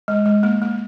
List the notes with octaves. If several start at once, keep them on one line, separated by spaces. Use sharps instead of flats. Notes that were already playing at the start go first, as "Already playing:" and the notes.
G#3
G#3
A#3
A#3